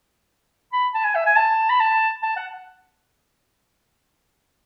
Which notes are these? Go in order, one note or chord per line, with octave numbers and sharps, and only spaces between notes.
B5
A5
G#5
E5
G#5
A5
B5
A5
A5
F#5